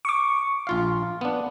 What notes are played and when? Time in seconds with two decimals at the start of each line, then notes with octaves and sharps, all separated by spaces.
0.05 C#6 D6
0.67 A#1 F4 F5
1.21 B3 D4